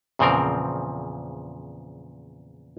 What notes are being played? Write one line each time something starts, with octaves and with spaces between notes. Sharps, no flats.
E2 A#2 C#3 F3 C4 A#4